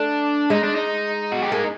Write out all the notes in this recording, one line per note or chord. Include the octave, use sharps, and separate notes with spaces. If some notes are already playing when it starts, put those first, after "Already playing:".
Already playing: A3 D4
G#3 D#4
D4
D#4
F#4
G4
A#3 G#4